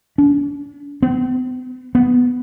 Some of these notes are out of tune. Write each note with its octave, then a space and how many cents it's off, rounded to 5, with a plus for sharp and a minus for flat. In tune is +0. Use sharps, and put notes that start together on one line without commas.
D4 -40
B3 +45
B3 +10